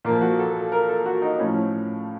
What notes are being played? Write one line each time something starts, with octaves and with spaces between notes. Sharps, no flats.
A#2 F3 A#3
F#4
A4
A4
A#4
A4
F#4
D#4
A2 F3 C#4